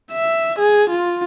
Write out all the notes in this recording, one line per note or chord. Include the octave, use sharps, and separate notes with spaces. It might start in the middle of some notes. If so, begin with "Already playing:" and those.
E5
G#4
F4